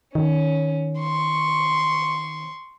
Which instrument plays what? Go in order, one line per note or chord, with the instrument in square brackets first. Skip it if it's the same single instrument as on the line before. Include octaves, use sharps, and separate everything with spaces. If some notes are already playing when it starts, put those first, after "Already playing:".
[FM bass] D#3 [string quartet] C#4
[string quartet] C6 C#6